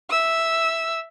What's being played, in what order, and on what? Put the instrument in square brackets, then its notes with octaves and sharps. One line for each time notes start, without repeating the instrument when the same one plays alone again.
[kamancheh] E5 E6